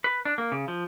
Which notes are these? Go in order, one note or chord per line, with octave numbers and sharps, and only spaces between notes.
B4
D4
A#3
C#3
F3